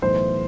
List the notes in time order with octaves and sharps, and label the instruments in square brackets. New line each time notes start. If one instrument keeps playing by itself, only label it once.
[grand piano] B1 A2 E3 C5